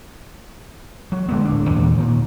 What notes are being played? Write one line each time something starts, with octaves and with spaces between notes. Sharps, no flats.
F#3
D3 G#3 A3 B3
D1 D4
D#2 A#2 D3
A#2 D#3